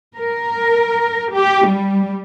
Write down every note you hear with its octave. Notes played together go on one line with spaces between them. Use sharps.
A#4
G4
G3